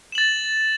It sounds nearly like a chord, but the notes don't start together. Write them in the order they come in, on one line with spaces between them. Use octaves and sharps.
E7 F#7 A6